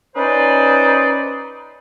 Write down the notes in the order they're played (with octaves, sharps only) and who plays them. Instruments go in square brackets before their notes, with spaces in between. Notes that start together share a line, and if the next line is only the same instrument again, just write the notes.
[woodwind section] C#4 D#4 B4 C5 D5